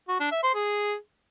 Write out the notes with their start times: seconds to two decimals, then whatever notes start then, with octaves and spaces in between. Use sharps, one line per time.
0.09 F#4
0.20 D4
0.32 E5
0.43 C5
0.55 G#4